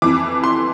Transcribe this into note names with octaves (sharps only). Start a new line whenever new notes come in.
F2 E3 D6
C6